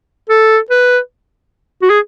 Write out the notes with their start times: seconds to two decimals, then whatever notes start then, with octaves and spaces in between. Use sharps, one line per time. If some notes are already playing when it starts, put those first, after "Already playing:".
0.30 A4
0.71 B4
1.83 F#4
1.90 G#4